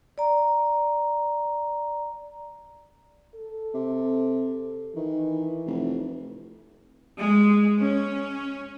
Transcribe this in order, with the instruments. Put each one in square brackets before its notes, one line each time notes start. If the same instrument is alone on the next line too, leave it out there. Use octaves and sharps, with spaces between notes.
[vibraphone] D5 A#5
[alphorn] A4
[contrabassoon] C3
[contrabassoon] D#3 [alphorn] E3
[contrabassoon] F1
[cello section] G#3
C#4